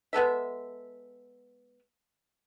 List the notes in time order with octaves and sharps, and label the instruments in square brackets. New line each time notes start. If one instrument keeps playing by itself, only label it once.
[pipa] G#3 B3 A4 E5